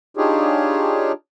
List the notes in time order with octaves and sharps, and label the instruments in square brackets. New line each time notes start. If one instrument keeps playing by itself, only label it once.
[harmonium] D4 D#4 F4 G4 G#4 C#5